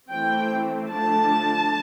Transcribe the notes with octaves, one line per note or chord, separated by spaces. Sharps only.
E3 A3 C4 G5
D3 F3 A3 D4 A5